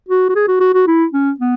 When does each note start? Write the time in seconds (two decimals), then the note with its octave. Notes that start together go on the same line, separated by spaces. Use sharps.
0.09 F#4
0.29 F#4
0.35 G#4
0.48 F#4
0.61 F#4
0.74 F#4
0.87 E4
1.13 C#4
1.40 B3